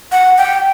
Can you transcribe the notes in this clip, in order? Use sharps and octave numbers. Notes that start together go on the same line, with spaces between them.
F#5
G5